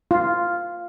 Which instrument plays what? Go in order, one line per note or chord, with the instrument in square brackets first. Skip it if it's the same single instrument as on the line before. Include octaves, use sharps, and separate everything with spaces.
[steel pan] F4